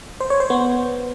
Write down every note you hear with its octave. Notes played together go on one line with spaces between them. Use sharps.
C5
C#5
C5
B3